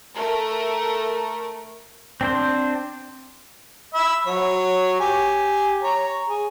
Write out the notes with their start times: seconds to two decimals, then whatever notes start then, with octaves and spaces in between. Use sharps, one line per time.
0.15 A3 A#4
2.21 C4 D4 C5
3.94 E5 B5
4.26 F#3 C#5
5.00 G4 G#5
5.83 C#5 A#5
6.28 G#4